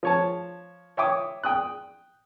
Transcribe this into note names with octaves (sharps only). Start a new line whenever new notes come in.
F3 C#5 A5
C#5 E5 G5 D6 D#6
G5 D#6 F#6